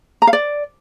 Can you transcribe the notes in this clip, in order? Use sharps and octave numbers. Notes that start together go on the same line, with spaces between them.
A#5
F5
D5